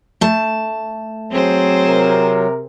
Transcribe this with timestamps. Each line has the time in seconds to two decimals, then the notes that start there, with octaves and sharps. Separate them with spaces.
0.21 A3 A5
1.31 F#3 C4 G#4 C5
1.87 C3 A#4